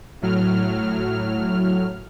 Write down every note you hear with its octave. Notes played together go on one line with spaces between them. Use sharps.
A2 F#3 F6